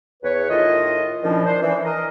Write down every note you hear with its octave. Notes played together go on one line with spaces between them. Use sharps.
E2 B4 C#5
A2 D#3 F4 D#5
A#2 D#3 F3 C#4 D4 E4
D4 C5
E3
A#4 D#5